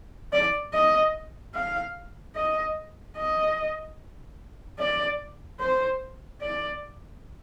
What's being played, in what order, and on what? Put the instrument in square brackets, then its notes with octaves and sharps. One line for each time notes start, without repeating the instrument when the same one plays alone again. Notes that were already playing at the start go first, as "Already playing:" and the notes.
[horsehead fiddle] D5
D#5
F5
D#5
D#5
D5
C5
D5